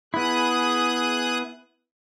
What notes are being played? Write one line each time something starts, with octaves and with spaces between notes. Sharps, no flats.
B3 E4 G#4 D#6 F#6